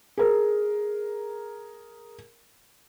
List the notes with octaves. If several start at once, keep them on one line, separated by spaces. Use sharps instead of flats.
G#4 A#4